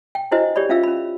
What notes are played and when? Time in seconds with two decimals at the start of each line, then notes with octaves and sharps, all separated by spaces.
0.15 G5
0.31 D4 E4 F#4 B4 C5 D#5
0.56 G4 C#5 D5 B5
0.69 C#4 F4 E5 F5 E6
0.83 C#4 B5